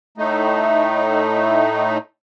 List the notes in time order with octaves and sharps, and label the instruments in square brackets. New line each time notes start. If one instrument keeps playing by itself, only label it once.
[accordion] A2 A3 D#4